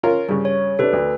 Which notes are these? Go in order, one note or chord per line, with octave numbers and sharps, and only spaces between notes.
C#4 F4 A#4
G2 C#3
C#5
C3 D4 A4 B4
D2